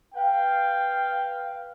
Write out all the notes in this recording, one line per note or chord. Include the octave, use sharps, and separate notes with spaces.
B4 F5 G5